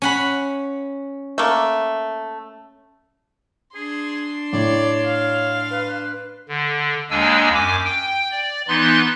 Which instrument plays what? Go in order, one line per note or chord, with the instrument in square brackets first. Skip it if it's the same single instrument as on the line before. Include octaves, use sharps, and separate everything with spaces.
[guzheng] C#4 F#5 B5
[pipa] A3 A#3
[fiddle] D4 C6 [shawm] G#4
[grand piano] A2 [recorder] C#5 [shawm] D5
[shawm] F5
[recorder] B4
[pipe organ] D3
D#2 G#3 A#3 D4 G#5 E6
F#2 G#5 D6
G5
D5
E3 B3 D#4 C6 F#6